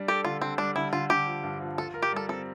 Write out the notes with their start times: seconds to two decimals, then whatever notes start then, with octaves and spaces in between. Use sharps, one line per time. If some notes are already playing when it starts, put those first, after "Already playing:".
Already playing: G3 D4
0.08 G4 A4
0.24 D3 F4
0.41 D3 C4
0.58 G3 D4
0.76 D3 E4
0.93 D3 F4
1.10 D3 G4
1.26 F3
1.43 G2
1.61 F3
1.78 F4 A4
1.94 A#4
2.02 G4
2.12 G3 A4
2.29 C4 A4